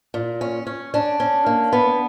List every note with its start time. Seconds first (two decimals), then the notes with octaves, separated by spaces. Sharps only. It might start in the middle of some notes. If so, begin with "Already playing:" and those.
0.14 A#2
0.41 C#4
0.67 C#4
0.94 C#4 D4
1.20 C#4
1.46 A#3
1.73 B3